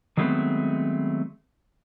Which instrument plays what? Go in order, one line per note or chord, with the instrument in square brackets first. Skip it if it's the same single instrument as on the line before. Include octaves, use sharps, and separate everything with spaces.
[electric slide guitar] D#3 F#3 G#3 A3 B3 C4